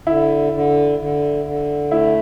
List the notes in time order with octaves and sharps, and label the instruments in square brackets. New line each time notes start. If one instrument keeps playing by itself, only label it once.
[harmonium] D3 [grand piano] E4
[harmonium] D3
D3
D3
[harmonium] A3 [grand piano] E4